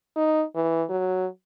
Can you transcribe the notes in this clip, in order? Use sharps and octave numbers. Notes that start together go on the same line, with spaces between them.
D#4
E3
F#3